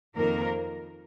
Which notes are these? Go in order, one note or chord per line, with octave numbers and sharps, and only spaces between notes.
F2 D#3 A#3 A#4